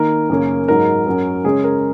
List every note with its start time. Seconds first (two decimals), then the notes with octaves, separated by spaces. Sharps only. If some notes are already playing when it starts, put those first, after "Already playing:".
Already playing: D#3 A#3 D#4 A#4
0.29 F#2 C#3 A#3 C#4
0.68 G#2 F#3 D#4 A#4
1.06 F#2 F#3 C#4
1.44 C#3 G#3 C#4 G#4
1.64 A#4